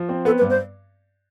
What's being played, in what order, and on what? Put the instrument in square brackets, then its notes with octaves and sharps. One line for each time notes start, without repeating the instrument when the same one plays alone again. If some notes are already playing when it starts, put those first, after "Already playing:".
Already playing: [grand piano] F3
C4
[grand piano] B3 [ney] A4
[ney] B4
[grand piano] G2
[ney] C5